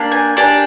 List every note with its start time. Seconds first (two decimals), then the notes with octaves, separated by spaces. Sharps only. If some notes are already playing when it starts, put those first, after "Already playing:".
Already playing: A#3 D4 G4
0.12 G#5
0.37 A#3 D4 G4 G#5